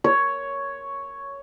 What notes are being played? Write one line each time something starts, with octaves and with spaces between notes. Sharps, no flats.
C#5